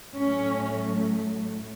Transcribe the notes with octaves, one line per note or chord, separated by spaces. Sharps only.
A2 F#3 A3 C#4